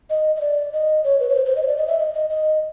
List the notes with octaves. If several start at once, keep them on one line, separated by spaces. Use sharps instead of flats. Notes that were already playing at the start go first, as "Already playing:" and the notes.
D#5
D#5
D5
D#5
C#5
B4
C#5
C5
C5
D#5
C#5
D5
D#5
E5
D#5
D#5
D#5